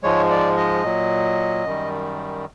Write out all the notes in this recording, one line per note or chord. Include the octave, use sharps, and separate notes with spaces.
G#2 F3 G#3 C#5
D5
D#5
A#2 F#3
F#2 D#3 G3